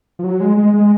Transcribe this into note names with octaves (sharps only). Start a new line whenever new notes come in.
F3
F#3
G#3
G#3
G#3